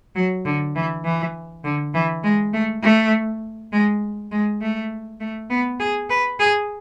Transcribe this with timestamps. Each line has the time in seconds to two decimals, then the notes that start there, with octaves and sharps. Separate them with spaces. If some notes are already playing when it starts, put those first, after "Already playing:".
0.16 F#3
0.45 D3
0.75 E3
1.05 E3
1.64 D3
1.94 E3
2.24 G#3
2.53 A3
2.83 A3
3.72 G#3
4.32 G#3
4.61 A3
5.20 A3
5.50 B3
5.80 G#4
6.10 B4
6.40 G#4